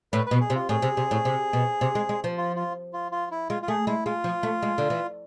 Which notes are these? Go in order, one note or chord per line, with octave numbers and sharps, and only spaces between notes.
A2 B4
B2 B4
G#4
C3
F4
A2 G#4
C3
C3
A2
C3
B2
C3
G#3
G#3
F3
F4
F4
F4
F4
E4
G#3 F4
F4
A3 G#4
G#3 E4
G#3 F4
F3
A3
G#3
D3
E3